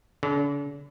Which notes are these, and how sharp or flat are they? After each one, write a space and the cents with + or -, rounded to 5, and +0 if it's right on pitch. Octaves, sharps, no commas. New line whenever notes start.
D3 -45